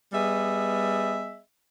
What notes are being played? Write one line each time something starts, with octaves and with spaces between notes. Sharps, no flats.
G3 B3 G#4 D#5 E5